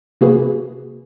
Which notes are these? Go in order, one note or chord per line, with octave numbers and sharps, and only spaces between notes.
C3 A#3 F#4 G#4 B4